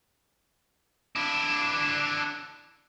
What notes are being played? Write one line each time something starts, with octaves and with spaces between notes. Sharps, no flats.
D4 E4